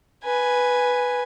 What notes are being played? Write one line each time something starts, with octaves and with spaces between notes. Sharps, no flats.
B4 G#5